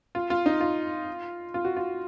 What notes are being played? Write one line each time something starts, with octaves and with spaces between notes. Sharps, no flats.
F4
F4
D#4
F4
F4
F#4
F4